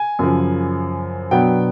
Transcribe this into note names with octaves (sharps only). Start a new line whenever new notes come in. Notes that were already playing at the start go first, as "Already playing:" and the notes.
Already playing: G#5
F#2 C#3 F3
B2 F#3 B3 D4 G5